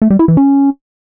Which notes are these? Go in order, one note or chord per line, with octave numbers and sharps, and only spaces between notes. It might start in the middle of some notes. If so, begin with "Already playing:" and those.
A3
G3
E4
E3
C#4